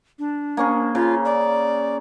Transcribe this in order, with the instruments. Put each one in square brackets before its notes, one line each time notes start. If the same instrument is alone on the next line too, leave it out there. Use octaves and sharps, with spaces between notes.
[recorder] D4
[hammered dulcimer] A#3 C#4 G#4
[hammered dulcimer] C#3 [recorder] F4
[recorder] D5